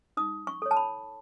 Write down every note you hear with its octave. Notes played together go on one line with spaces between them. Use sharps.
D#4 D#6
C#6
A4 C#5
A5
B5